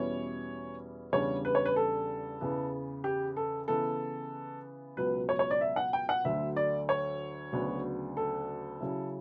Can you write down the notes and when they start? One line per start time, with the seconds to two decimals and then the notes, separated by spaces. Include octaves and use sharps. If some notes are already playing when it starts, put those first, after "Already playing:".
Already playing: E2 B2 G3 C#4 E4 C#5
1.12 E2 C#3 G3 D4 C#5
1.45 B4
1.55 C#5
1.66 B4
1.76 A4
2.41 E2 C#3 E3 B3
3.04 G4
3.37 A4
3.68 C#3 E3 B3 A4
4.97 C#2 B2 F#3 B4
5.29 C#5
5.39 C#5
5.51 D5
5.61 E5
5.76 F#5
5.93 G5
6.09 F#5
6.24 D2 D3 F#3 A3 E5
6.56 D5
6.89 C#5
7.53 D2 C#3 F#3 B3 D4
8.17 A4
8.80 C#3 F#3 C#4 E4